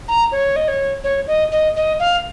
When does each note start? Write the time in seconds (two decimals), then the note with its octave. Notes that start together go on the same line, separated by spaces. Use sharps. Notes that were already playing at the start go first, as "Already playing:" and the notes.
0.08 A#5
0.32 C#5
0.56 D#5
0.68 C#5
1.04 C#5
1.27 D#5
1.52 D#5
1.76 D#5
2.00 F5